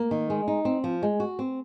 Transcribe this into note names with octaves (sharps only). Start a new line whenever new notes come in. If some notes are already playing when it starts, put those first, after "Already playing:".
Already playing: A#3
D#3
G#3
D#4
C4
F3
G#3
F#4
C4